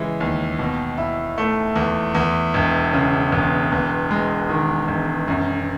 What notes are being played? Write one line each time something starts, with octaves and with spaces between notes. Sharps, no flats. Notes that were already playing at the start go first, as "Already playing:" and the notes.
Already playing: C#3 E3 G#3
D#2
B2
E4
A3
E2
E2
E1
C#3
E1
E2
G#3
D#3
E1
F#2